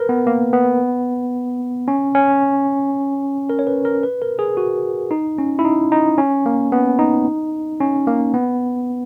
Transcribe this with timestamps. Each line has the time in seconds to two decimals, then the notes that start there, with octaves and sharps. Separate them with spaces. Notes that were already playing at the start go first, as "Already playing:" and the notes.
Already playing: A#4 B4
0.09 B3
0.27 A#3
0.53 B3
1.88 C#4
2.15 C#4
3.50 A#4
3.59 C#5
3.67 B4
3.85 A#4
4.03 B4
4.22 A#4
4.39 G#4
4.57 F#4
5.11 D#4
5.38 C#4
5.59 E4
5.65 D#4
5.92 D#4
6.18 C#4
6.46 A#3
6.72 B3
6.99 D#4
7.80 C#4
8.07 A#3
8.34 B3